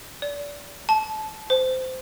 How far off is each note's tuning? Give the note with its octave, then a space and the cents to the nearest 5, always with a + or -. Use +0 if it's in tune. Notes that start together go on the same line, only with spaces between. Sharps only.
D5 -30
A5 -25
C5 -20